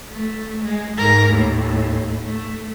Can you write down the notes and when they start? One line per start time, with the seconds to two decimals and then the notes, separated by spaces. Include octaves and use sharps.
0.10 A3
0.63 G#3
0.97 G#2 A#4
1.31 D#2 A2
2.22 A3